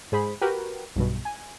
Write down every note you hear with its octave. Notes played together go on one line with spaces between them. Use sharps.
G#2 G#4 C5 B5
F#4 G4 A#4 B4 G5
B1 G2 B2
G#5